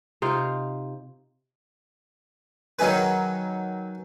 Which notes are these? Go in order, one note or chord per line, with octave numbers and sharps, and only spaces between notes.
C3 D#4 F4
D#3 F#3 D#4 G#4 B4